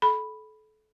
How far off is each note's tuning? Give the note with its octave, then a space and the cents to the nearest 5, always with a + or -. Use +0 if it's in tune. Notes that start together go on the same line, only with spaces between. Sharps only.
A4 -30 B5 +0